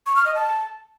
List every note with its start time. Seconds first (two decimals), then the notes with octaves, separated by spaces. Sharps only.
0.06 C#6
0.16 F6
0.25 D#5
0.35 A5